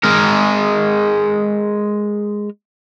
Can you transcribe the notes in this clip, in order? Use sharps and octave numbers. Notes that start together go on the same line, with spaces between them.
G#3 A#4